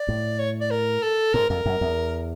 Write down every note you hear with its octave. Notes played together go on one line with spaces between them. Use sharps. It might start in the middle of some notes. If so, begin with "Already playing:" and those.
Already playing: D5
A2
C#5
D5
A#4
A4
G#2 A#4
F2 A#4
F#2
E2